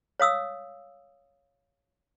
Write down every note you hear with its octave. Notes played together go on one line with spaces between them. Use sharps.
C#5 F5 D#6 E6